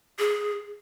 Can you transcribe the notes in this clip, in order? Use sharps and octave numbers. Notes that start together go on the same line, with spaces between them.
G#4